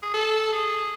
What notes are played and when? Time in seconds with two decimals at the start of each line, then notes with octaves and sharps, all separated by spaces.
0.03 G#4
0.14 A4
0.52 G#4